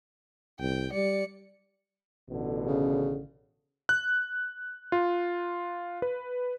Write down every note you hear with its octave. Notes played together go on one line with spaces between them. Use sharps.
C2 G5
G3 D5 C#7
A1 B2 D3
C#3
F#6
F4
B4